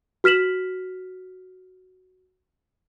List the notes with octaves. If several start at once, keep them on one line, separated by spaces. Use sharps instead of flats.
F#4 F6 B6 E7 F#7